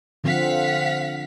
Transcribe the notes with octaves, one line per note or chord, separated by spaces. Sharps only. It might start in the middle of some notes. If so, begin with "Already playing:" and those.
D3 F3 C4 F5 F#5 B6